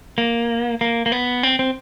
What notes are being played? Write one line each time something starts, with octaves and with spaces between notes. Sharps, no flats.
A#3
A#3
A#3
B3
C4
C4